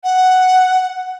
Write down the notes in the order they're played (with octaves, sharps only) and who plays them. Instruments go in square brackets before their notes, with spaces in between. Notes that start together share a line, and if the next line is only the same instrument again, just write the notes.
[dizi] F#5